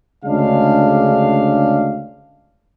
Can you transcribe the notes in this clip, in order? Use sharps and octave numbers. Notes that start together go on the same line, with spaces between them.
D2 C#3 G#3 D4 F5